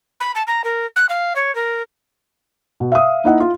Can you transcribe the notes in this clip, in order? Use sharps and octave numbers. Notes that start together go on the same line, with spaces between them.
B5
A5
A#5
A#4
F#6
F5
C#5
A#4
B2
E5 F5 D#6
A#3 D#4 E4 D#5 E5 F#5
F4